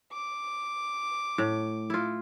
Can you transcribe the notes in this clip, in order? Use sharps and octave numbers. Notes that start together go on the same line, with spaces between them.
D6
A2
E4 F4